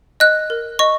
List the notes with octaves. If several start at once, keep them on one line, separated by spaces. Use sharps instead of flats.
D#5 F#6
A#4
D#5 C#6